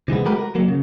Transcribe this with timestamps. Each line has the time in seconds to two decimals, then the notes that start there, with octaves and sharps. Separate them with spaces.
0.08 C3 E3 G#3 B3
0.25 G#3 A3 F#4 G4 A#4 B4
0.39 A#4
0.55 F#3 A#3
0.68 C#3